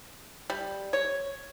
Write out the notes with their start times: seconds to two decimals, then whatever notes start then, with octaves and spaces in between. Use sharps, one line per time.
0.50 G3
0.93 C#5